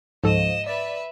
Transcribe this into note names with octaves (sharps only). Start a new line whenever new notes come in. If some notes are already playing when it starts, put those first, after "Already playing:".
C#2 G#2 F3 A4 D#5 E7
B4 D5 E5